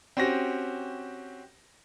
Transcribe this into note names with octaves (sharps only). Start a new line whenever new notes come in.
C4 C#4 F#4 G4 A#6